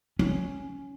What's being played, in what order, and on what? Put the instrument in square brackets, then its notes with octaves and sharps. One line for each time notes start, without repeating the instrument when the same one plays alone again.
[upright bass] C#4